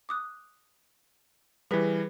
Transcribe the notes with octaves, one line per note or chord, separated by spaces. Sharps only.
D6 D#6 F#6
E3 G3 G#4 B4 B6